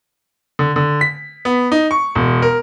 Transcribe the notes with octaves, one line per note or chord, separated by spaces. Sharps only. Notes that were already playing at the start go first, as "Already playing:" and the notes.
D3
D3
B6
B3
D#4
C#6
E1
A#4